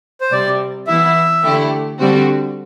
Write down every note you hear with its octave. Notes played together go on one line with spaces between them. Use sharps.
C5
C3 G3 C4 D5
E3 B3 E4 E5
D3 A3 E4 G4
D3 G3 C4 F#4